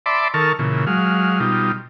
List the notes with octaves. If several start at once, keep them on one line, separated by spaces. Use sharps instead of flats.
D5 E5 A5 B5 C6 D6
D#3 A4 A#4 A5 C#6 F6
A#2 C#3 E3
F#3 G#3 F5
B2 G3 D#4 F4